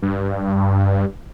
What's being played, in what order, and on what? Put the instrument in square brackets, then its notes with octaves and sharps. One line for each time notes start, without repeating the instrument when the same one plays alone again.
[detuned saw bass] G2